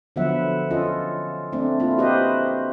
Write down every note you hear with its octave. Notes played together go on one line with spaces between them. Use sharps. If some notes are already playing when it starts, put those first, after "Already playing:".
D3 F3 F#3 B3 E5 F#5
C#4 F4 A4 D#5
A3 C4 D4
A3 A#3 C4 E4 F4
F#4 G4 B4 C5 D#5